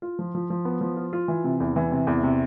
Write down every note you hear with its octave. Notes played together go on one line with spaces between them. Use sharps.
F4
F3
F3
F3
B3
F3
F4
F4
E3
C3
E2
E3
C3
E2
C3